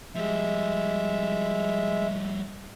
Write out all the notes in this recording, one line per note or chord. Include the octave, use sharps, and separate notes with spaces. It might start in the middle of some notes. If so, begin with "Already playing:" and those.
F3 G3 G#3 E5